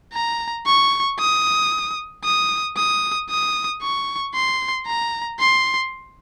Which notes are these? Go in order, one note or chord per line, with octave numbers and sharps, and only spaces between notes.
A#5
C#6
D#6
D#6
D#6
D#6
C#6
C6
A#5
C6